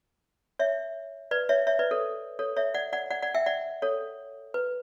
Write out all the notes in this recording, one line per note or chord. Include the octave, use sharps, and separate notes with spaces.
C#5 E5
B4 D5
C#5 E5
C#5 E5
B4 D5
A4 C#5
A4 C#5
C#5 E5
D5 F#5
D5 F#5
D5 F#5
D5 F#5
E5 G5
D5 F#5
A4 C#5
B4